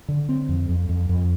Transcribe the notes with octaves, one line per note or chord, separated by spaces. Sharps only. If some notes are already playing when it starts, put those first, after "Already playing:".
D3
C4
F2
F2
F2
F2